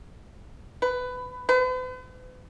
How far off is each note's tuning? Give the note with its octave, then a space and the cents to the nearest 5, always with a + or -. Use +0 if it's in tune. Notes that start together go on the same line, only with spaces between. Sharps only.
B4 +20
B4 +45